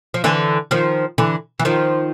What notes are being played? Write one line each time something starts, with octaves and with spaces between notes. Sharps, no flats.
F3
D3 E3
D#3 F3
D3 E3
E3
D#3 F3